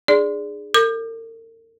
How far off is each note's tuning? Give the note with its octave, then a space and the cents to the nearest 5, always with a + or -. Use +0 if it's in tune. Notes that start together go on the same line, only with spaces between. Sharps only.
D4 +40 G#4 +0 D5 +0
A#4 -45 D6 +40